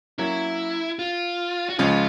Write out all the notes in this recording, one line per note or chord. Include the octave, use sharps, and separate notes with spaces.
F#3 A#3 C#4 E4
F4
F#4
C#2 C#3 F3 G#3 C#4 F4